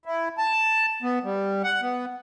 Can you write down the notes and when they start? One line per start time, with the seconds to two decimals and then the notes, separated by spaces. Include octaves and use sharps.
0.06 E4
0.38 A5
1.02 B3
1.24 G3
1.64 F#5
1.82 B3